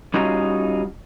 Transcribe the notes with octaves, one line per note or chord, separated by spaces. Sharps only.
G3 C#4 D#4 F4 F#4